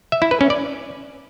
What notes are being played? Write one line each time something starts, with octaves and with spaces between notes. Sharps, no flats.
E5
E4
B4
C#4
D5